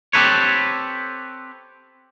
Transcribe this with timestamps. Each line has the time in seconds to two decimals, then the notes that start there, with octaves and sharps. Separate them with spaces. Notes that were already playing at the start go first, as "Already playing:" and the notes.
0.13 C4 G4 A4 B4 C#5